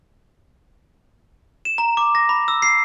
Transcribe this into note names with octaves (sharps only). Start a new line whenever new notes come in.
E7
A#5
D6
A#6
B5
E6
C7